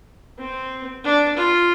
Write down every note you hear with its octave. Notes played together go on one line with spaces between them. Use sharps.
C4
D4
F4